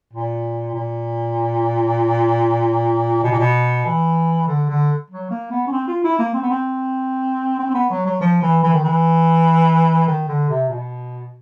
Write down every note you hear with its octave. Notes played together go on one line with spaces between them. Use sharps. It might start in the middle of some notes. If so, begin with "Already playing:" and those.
A#2
A#2
B2
A#2
B2
E3
D3
D3
F#3
A#3
B3
C#4
C4
F4
E4
A#3
C4
B3
C4
C4
C4
B3
F#3
F#3
F3
E3
E3
D#3
E3
D#3
D3
C3
B2